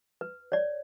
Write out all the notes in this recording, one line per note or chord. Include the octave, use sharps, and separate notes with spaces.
B4
C#5 D5